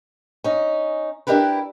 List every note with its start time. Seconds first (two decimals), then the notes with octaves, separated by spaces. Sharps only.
0.44 C#4 D#4
1.27 D4 E4 G4 A#4 B4